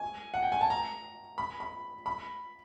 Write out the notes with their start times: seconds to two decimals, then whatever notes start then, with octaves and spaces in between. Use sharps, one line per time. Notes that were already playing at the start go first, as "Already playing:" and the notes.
Already playing: G#5
0.34 F#5
0.43 G5
0.52 G#5
0.61 A5
0.70 A#5
1.38 B5
1.60 B5
2.06 B5